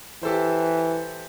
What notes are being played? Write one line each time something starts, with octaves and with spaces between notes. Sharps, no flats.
E3 G4 A4 C5